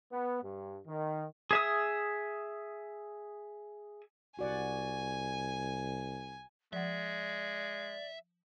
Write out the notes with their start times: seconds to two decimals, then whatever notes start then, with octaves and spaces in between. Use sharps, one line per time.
0.11 B3
0.43 G2
0.86 D#3
1.51 G#4 E5 D#6
4.39 C2 F#4 D5 F#5 G#5
6.73 F3 G#3 D5 E5 F#5